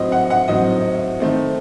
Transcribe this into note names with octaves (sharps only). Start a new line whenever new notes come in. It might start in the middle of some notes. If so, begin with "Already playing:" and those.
Already playing: A2 F#3 C4 D#5
F#5
F#5
A2 F#3 C4 D#5
D#3 A3 C4